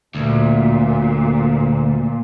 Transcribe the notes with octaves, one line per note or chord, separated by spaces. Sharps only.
D2 A#2